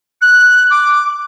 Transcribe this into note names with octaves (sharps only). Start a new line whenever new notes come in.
F#6
D6